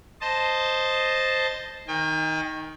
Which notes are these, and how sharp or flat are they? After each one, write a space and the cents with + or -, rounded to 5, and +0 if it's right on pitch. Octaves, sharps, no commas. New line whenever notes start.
C5 +0 D#5 -5 A5 +0
D#3 +10 G5 +40